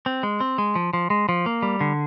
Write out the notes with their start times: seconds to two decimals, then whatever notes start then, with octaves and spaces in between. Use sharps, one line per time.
0.06 C4
0.23 G#3
0.40 C4
0.58 G#3
0.75 F3
0.93 F3
1.10 G#3
1.29 F3
1.46 A#3
1.63 G3
1.81 D3